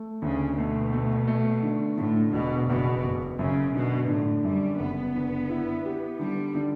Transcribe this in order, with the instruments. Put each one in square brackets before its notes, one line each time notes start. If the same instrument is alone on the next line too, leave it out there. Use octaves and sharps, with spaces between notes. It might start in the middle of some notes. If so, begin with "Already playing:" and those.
Already playing: [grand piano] A3
[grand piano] D2 [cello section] C#3
[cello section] B2 [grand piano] A3
[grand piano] A3
A3
D3
[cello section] A2 [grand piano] D3
[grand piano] E1 [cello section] B2
[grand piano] F#1 [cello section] B2
[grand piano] F#1
[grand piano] F#2 [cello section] C#3
[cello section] B2 [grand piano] D3
[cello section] A2 [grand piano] D3
[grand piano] F#2 [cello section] G3
[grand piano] F#1 [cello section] B3
[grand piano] D3
E4
G4
[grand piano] D3 [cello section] G3
[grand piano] D3